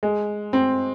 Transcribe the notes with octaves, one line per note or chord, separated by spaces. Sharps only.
G#3
C4